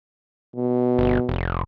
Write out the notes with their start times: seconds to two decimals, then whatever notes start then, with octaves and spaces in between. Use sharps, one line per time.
0.56 B2
0.99 G1
1.29 F1